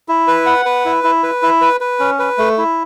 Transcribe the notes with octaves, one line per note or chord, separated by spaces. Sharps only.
E4
B4
F#5
B4
E4
E4
B4
E4
B4
B4
C#4
B4
A3
E4